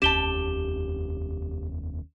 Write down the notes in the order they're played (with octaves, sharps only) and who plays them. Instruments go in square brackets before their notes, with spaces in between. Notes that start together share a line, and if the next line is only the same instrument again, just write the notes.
[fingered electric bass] F1 D#2 C#4 [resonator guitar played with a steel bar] G4 A5 [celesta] E7 G7